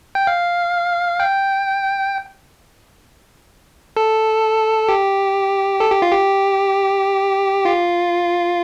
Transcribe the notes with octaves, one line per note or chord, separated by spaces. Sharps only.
G5
F5
G5
A4
G4
A4
G4
F4
G4
F4